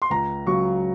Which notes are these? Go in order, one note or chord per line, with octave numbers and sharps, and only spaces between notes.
C6
C#2 A#5
C#3 F#3 C#6